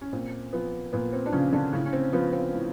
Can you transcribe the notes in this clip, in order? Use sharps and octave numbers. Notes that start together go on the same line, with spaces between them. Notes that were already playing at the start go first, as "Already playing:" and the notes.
C#4
A#2 C4
F3 B3
A#2 B3
C4
D4
C#3 F3 C#4
D3 D4
A2 C#3 C#4
C#4
C4
F3 B3
C4
A2